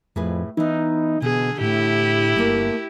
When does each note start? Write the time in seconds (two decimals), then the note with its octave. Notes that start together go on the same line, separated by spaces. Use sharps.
0.16 F2 A2 G#4 B4
0.57 E3 B3 D#4
1.22 B2 D3 G#4
1.61 A2 E4 G4
2.36 G1 A3 A#3